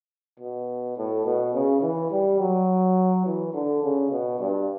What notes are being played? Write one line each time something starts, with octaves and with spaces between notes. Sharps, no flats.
B2
A2
B2
C#3
E3
G3
F#3
E3
D3
C#3
B2
G2